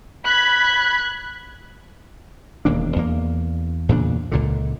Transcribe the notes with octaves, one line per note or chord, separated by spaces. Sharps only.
B5 F#6 G#6
E1 D#2 A#3 D4
E2 A#3
E2 A#2 C#3 D4
C#2 A#2 D3